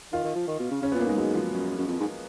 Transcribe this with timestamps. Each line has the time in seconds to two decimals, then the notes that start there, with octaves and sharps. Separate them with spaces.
0.12 D#3 F4
0.24 D#3
0.36 F3
0.48 D#3
0.60 B2
0.71 C#3
0.82 C#3 C#4
0.92 A#2 B3
1.00 A#3
1.06 G#2 G#3
1.17 F#3
1.35 F3
1.52 F#2
1.78 F#2
1.88 F2
2.00 G#2